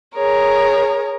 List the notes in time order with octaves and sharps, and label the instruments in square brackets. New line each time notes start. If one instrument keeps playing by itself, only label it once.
[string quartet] G#4 A#4 C#5